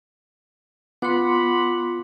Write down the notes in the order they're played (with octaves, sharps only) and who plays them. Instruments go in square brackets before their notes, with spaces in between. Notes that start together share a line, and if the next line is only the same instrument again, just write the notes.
[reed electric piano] B3 F4 [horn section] F#5 B5 [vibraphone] C6 D6